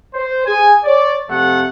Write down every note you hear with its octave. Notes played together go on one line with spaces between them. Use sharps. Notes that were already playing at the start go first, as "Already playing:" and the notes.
C5
G#4 G#5
C#5 D5
F2 C3 A3 F#5